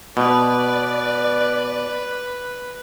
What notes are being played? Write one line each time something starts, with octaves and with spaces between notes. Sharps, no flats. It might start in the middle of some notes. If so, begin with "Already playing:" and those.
B2 B4 D5